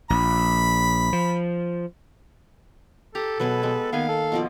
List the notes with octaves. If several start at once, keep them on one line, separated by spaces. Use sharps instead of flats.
A#1 B5
F3
G4 A4 A#5
B2 F#3 B3 G#4 B4
G#3 B3 G4
D#3 A#3 B3 F5 G#5
A4
B2 F3 D5